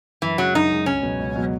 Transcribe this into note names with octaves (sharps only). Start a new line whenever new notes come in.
F#2 E3
C#3 F#3 G#3
F#2 D#4
C#3 G#3
C#2 C#4
B2 F#3 B3 F#4
C#2
B2 F#3 B3 F#4